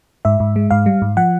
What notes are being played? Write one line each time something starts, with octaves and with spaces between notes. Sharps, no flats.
G#2 E5
G#2
G#3
G#2 F5
G3
G#2
F3 F#5